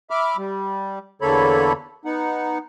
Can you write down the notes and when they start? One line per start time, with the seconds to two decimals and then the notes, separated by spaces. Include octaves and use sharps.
0.10 E5 B5 D6 F6
0.37 G3
1.22 E2 D3 A#3 A4 C#5 B5
2.05 B3 D#4 F#5